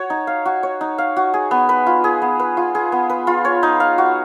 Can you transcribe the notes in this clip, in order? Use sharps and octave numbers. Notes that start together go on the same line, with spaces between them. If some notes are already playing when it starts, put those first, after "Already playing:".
Already playing: F#4 C#5
D#4
F5
F#4
C#5
D#4
F5
F#4
G#4
B3
B4
F4
G#4
B3
B4
F4
G#4
B3
B4
F4
C#5
D#4
F5
F#4